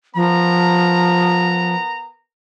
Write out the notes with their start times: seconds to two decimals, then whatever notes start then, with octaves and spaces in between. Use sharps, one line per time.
0.15 F3 B3 A#4 A#5